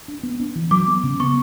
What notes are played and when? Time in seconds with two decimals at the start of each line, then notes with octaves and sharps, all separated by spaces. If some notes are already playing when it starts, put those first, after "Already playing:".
0.08 D4
0.23 B3
0.40 D4
0.56 E3
0.71 F#3 D6
0.88 B3
1.03 C#3
1.20 B3 C#6